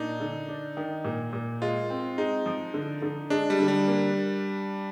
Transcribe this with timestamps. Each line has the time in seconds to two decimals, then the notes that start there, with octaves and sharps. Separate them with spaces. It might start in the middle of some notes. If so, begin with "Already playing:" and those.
Already playing: A#2 D4 D#4
0.20 D3
0.48 D4
0.77 D#3
1.05 A#2
1.33 A#2
1.62 G#3 F4
1.90 C4
2.18 G#3 D#4
2.46 F3
2.74 D3
3.02 D3
3.30 G#3 D4
3.50 G3
3.59 D3
3.68 G3
3.88 A#3